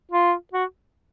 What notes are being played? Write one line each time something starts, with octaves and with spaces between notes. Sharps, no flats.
F4
F#4